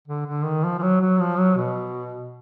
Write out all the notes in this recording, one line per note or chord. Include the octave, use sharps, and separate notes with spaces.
D3
D3
D#3
F3
F3
F#3
F#3
F3
F#3
B2